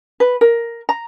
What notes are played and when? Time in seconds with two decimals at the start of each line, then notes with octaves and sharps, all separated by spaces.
0.20 B4
0.41 A#4
0.89 A#5